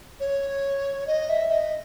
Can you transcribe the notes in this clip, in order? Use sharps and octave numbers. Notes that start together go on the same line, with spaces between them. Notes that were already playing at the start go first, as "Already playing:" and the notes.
C#5
D#5
E5
D#5